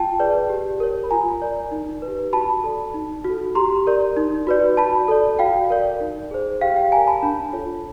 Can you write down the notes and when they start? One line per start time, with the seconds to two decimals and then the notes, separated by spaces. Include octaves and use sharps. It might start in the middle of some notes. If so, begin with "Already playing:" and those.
Already playing: F4 G5 A5
0.19 G#4 B4 D5
0.49 G4
0.80 A#4 C#5
1.04 B5
1.11 F4 G#5 A#5
1.42 A#4 D5
1.72 D#4
2.02 B4
2.08 G4
2.33 F#4 A5 B5
2.64 A4 D5
2.94 D#4
3.24 F#4 A4
3.55 G4 A#5 C6
3.87 A#4 D5
4.17 D#4
4.47 F#4 B4 D5
4.77 F#4 A5 B5
5.08 A4 D5
5.39 F#4 F5 G5
5.70 A#4 D5
6.00 D#4
6.31 G#4 C5
6.61 G4 F5 G5
6.76 F5 G5
6.91 D5 G#5 A#5
6.97 A#4
7.07 A5 B5
7.23 D4
7.53 F4 A4 C#5